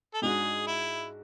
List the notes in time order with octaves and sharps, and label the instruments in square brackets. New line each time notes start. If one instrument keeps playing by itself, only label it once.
[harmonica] A4
[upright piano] G#2 G#3 D4 F#4 [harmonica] G#4
[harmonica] E4